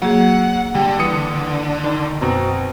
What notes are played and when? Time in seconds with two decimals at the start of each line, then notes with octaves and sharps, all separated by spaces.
0.02 F#3 A#3 G#4 F#5
0.75 D3 G3 G5
0.99 E3 D#6 C#7
1.84 D#3
2.22 F#2 B2 C4 A#5